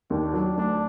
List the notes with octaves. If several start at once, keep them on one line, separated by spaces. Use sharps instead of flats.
D#2 D4
F#3
D2 D4